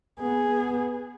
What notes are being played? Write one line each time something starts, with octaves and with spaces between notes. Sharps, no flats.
B3 G#4
B3